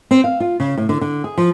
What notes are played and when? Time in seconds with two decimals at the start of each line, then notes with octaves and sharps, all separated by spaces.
0.11 C4
0.24 F5
0.40 F4
0.60 C#3
0.78 A2
0.89 D3
1.01 D3
1.24 G#4
1.38 F3